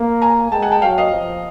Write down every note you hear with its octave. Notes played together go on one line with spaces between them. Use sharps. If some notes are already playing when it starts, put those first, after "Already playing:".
Already playing: A#3
G#5 A#5
G#3 G5 A5
F#5 G#5
G5 A5
F#3 F5 G5
D#5 F5
F3